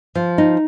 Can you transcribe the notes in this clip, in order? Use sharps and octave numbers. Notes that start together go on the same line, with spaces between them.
F3
D#4